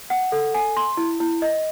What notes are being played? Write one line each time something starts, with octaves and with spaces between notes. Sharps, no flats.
F#5
A4
G#5
C6
E4
E4
D#5